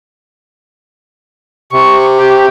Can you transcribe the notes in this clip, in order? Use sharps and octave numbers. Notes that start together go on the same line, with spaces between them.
C3 C#6
G4